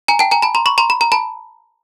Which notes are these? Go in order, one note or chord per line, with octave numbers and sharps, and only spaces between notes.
G#5 A#5
G5 A5
G#5 A#5
A5 B5
A#5 C6
B5 C#6
A#5 C6
B5
A#5
A5 B5